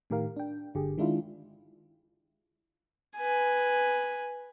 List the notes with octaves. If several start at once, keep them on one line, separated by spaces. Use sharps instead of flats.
A2 D#3 G4 A#4 F5
D4 G5
G1 D3 G4 G#4
D#3 G#3 D4 E4 F4
B4 G#5